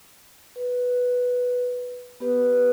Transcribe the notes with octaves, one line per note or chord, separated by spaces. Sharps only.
B4
B3 G4 B4